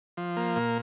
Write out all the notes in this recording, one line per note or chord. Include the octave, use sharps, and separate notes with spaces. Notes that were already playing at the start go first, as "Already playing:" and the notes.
F3
A#3
A#2